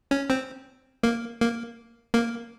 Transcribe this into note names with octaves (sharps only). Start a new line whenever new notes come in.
C#4
C4
A#3
A#3
A#3